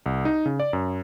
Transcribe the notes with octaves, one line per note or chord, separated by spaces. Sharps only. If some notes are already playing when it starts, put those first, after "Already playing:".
C2
D#4
C#3
D5
F#2